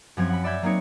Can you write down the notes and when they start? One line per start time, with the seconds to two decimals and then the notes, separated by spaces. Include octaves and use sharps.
0.17 F#2 F3 C4 G#6
0.29 F#5 B5
0.44 D5 E5 B5 G6 G#6
0.62 F#3 A#3 C4 D#4 C#5